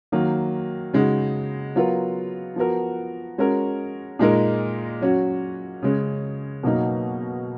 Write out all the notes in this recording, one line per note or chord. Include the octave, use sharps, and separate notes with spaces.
D#3 F#3 A#3
C#3 G#3 D#4 F#4
F#3 B3 F4 A#4
F3 B3 F#4 A#4
G#3 C#4 F#4 A#4
A#2 G#3 D#4 A#4
F#3 C#4 F#4
C#3 G#3 C#4
B2 F#3 A#3 D#4